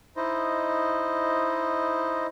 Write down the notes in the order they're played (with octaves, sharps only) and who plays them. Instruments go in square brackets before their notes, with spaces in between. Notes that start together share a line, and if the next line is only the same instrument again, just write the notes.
[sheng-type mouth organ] D#4 E4 C5 D#5